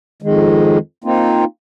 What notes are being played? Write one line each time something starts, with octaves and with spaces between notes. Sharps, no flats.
F2 D#3 G#3
A#3 C4 D#4 F4